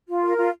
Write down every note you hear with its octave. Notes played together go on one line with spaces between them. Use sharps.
F4
A#4
F4